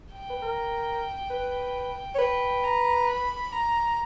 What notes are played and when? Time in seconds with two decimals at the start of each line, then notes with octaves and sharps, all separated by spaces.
0.13 G5
0.30 B4
0.42 A#4
1.30 B4
2.15 C#5
2.19 B4 G5
2.64 A#5
3.09 B5
3.52 A#5